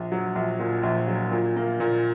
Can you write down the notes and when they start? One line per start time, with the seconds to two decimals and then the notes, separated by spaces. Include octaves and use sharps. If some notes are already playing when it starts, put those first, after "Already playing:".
Already playing: A#1
0.12 F#3
0.35 A#1
0.59 A#2
0.83 A#1
1.08 F#3
1.31 A#2
1.56 A#3
1.80 A#2